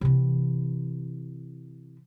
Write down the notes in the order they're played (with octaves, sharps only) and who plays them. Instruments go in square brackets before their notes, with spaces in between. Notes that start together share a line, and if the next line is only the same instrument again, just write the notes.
[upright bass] C3 E3